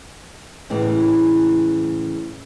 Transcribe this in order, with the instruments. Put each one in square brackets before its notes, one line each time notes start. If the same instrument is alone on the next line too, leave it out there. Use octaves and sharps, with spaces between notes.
[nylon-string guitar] A2 C#3 E3 G#3